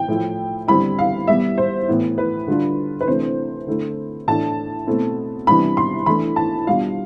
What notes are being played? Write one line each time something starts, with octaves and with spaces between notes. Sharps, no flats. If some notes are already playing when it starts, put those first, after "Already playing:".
Already playing: G5
A2 F3 A3 E4
D3 G3 C4 E4 B5
F5
B2 G3 B3 E5
C5
A2 E3 B3 E4
B4
D3 G3 D4 F4
B4
C3 E3 A3 D4 C5
D3 A3 E4
A2 E3 A3 D4 A5
B2 A3 C4 E4
C3 E3 G3 B3 D4 B5
C6
E3 A3 D4 B5
A5
B2 G3 D4 F4 F5